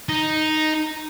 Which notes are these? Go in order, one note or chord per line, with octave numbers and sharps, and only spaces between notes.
D#4